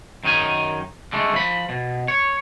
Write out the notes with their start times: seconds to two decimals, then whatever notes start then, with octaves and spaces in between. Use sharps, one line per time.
0.24 F#2 D#3 D#4 G#5
1.12 D3 G#3 A3
1.34 F3 B5
1.69 B2
2.08 C#5